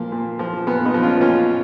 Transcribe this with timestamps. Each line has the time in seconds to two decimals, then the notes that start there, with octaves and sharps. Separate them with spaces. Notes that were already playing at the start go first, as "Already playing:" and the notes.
Already playing: A#2 F3 A#3
0.12 A#2
0.39 F3
0.67 A#2 B3
0.85 B3 D#4
0.94 F3
1.03 C#4 F4
1.21 A#2 C#4 F4